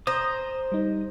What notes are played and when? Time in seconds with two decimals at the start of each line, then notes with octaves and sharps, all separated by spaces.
0.07 C5 A#5 D#6
0.72 G3 D#4